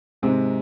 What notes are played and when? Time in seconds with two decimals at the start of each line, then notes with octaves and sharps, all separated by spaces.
0.22 G#2 C3 D#3 G#3 C4